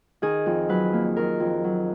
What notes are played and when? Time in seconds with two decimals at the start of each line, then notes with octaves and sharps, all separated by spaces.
0.22 D#3 G#4
0.46 F2
0.69 F#3 B4
0.93 A#3
1.16 D#3 A#4
1.40 F2
1.64 F#3